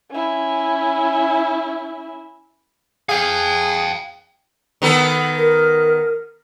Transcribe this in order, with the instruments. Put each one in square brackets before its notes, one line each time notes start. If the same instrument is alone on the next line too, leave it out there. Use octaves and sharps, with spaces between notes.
[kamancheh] C#4 E4
[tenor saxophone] G#4 [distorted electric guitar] F5 G5
[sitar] D#3 B3 A4
[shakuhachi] A#4